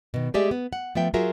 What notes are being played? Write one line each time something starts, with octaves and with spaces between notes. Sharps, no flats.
B2 D#3
G#3 A3 G4 G#4 D5 E5
B3
F#5
F3 A3 B3 E5 G5
F#3 F4 F#4 G#4 A#4 E5